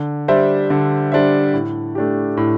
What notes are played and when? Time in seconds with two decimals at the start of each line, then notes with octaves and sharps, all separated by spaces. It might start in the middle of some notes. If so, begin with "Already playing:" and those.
Already playing: D3
0.28 G3 D4 C5 E5
0.70 D3
1.12 G3 D4 C5 E5
1.54 A2
1.95 A3 D4 G4
2.37 A2